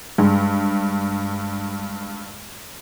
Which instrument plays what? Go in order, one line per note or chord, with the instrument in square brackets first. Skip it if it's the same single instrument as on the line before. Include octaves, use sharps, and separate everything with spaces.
[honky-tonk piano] G2 [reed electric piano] G#3